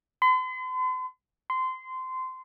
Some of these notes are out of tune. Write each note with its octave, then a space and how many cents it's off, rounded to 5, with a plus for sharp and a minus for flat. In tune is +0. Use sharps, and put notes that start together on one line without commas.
C6 -45
C6 -20